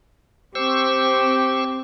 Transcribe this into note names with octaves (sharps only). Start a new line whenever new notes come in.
C4 G4 C5 C#6 E6